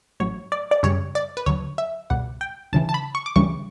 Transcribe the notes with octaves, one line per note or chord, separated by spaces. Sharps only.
A1 A2 F#3 C#5
D5
D5
F#2 C#3 G3 C#5
D5
B4
D2 D3 F#3 C#5
E5
C#2 B2 G3 F#5
G5
D2 C#3 E3 A5
A5
B5
C#6
D6
D2 C#3 E3 G3 C#6